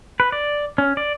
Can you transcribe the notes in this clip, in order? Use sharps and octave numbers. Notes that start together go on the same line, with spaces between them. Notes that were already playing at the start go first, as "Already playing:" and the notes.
B4
D5
C#4
D5